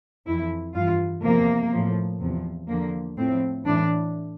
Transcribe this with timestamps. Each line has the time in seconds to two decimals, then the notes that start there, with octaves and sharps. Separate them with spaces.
0.26 F2 E3 E4
0.74 G2 E3 F4
1.23 E2 C3 F3 A#3
1.72 A2 F3
2.20 E2 C3 F3
2.68 E2 D3 F3 A#3
3.17 A2 F3 C4
3.65 A2 E3 D4